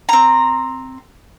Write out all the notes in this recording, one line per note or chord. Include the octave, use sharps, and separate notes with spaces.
C4 A#5